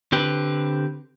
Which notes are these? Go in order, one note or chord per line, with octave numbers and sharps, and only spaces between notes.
D3 C4 G4 B4